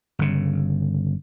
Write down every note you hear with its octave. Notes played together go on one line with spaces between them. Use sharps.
G1 C#3